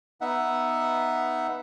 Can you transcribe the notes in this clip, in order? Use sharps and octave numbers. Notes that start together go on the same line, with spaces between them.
B3 D#4 E5 F#5